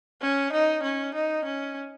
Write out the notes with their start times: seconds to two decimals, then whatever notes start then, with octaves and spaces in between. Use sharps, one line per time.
0.22 C#4
0.53 D#4
0.83 C#4
1.14 D#4
1.45 C#4